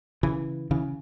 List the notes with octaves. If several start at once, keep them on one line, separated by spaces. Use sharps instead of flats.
C#3 E3
C#3 E3